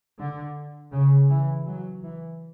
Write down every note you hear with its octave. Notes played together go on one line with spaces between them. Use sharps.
D3
C#3
E3
F#3
E3